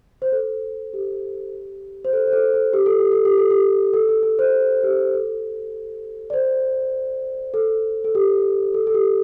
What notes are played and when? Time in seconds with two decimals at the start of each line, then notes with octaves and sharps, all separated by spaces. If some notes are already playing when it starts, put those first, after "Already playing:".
0.22 C5
0.32 A4
0.93 G4
2.04 C5
2.13 A4
2.27 C5
2.33 A4
2.54 A4
2.73 G4
2.86 A4
2.99 G4
3.12 A4
3.25 G4
3.38 A4
3.50 G4
3.93 A4
4.09 A4
4.23 A4
4.39 C5
4.83 G4
5.14 A4
6.30 D5
6.33 C5
7.54 A4
8.04 A4
8.15 G4
8.74 A4
8.87 A4
8.94 G4